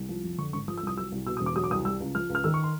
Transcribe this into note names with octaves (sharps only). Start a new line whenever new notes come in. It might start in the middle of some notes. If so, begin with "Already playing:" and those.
Already playing: C2
F3
F2
D3 C#6
G#1 C#6
F3 D#6
E6
C2 D#6
F#3 E6
C2
B2 E6
D#6
E1
D6
F#3 D#6
D6
C2 D#6
G3 E6
C#2
F3 F6
C#2
F6
D#3 E6
C#6
C6